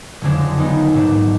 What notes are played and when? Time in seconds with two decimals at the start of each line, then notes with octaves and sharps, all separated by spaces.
0.21 F#1 F2 D3 G#3 D4
0.57 D#2 D#3 G#3 B3 D#4
0.94 A#1 G#2 F#3 D4